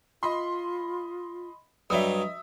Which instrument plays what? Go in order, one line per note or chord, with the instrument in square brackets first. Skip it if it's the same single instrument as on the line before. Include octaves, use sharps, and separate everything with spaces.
[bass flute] F4 [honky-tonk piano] D#5 B5 C6
[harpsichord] G2 F#3 [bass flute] D#5 [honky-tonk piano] E5 D#6